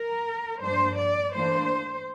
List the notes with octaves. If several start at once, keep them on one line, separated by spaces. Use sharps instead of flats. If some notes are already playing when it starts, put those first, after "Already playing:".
Already playing: A#4
G2 F3 A#3 D4 C5
D5
A2 E3 A#3 D4 C5